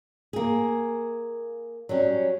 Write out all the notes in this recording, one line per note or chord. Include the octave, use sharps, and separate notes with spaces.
A#3 G#4
F#3 G3 C#4